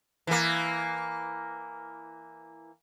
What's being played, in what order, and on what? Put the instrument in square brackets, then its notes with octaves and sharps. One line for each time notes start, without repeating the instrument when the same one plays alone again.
[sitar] E3 A#3